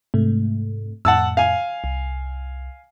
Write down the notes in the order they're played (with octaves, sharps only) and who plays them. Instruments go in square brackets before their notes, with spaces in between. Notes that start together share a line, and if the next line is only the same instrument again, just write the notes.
[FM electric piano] G#2 C3 A3
[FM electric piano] F2 A2 [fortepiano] F#5 A5 E6
[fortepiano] F5 G#5
[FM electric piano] C2